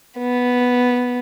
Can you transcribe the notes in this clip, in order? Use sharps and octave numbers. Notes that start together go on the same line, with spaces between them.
B3